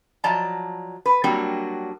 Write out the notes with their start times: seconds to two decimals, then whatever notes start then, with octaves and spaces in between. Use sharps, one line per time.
0.24 F3 F#3 D5 D#5 A5 A#5
1.06 B4
1.24 F#3 G3 A#3 C4 D4 F#4